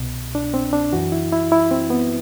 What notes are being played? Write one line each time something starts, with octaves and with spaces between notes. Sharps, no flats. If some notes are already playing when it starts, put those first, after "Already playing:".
Already playing: C2 B2
D4
C4
D4
F#2 E3 F#4
E4
E4
E4
C4
B3